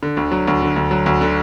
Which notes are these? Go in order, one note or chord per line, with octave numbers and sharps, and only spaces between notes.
D3
D2
F#3
D2
D3
D2
F#3
D2
D3